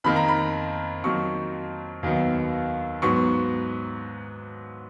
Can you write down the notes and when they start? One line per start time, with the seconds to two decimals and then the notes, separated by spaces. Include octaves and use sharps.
0.04 F2 D#3 A#3 B5
0.16 A#5
0.28 B5
1.03 F2 D#3 F#3 A#3 C#6
2.03 D#2 D#3 F#3 B3
3.02 G#2 F#3 B3 C#6